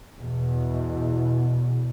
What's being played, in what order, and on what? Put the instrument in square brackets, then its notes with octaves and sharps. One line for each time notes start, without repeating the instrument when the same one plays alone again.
[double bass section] E2 B2